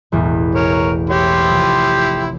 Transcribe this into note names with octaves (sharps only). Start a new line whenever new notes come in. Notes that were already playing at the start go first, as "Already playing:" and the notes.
E1 A1 E2
A#4 C#5
E4 G4 C#5 C6
F1 D#6 E6